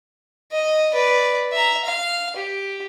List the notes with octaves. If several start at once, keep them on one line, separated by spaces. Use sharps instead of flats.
D#5
B4 D5
E5 A#5
F5
G4